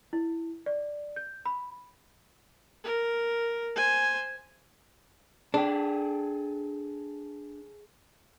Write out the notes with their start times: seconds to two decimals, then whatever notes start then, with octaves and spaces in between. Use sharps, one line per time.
0.13 E4
0.66 D5
1.16 G6
1.46 B5
2.84 A#4
3.76 C5 G#5
5.54 D4 G#4 A4 G5